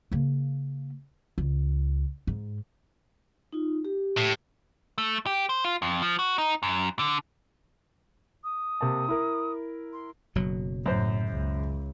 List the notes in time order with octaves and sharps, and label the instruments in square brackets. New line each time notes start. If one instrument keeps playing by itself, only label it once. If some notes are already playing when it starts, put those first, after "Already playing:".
[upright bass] C#3 A#3
C#2
G#2
[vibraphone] D#4 F4
G4
[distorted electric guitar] A2
[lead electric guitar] A3
G4
C5
F4
F2
F3
F#4
D#4
F#2
D3
[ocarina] D#6
[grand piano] C3 A#3 A5
E4 A#4
[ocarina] C6
[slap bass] F#1 B2 F#3
[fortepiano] F#2 C5 [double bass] A2
[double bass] C#2